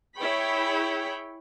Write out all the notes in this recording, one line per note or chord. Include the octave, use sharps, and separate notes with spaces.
E4 G#4 C#5 G5 B5